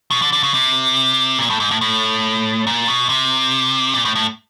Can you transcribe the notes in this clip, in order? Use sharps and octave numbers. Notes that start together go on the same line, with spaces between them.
B2
D3
D3
C#3
C3
A#2
A2
G#2
A2
A2
A#2
B2
C3
A#2
A2
A2